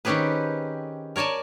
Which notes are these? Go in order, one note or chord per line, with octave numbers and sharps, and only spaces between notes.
D#3 C4 C#4 G4 G#4 B4
A#4 C#5 D5 G#5 A5